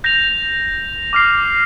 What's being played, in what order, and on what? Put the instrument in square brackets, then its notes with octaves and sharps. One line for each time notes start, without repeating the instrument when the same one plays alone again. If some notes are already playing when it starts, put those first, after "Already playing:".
[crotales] G6 A#6 F7
D6 F6 C7